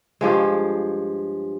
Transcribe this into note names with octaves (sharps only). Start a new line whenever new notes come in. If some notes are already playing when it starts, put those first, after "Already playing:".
G2 F3 G#3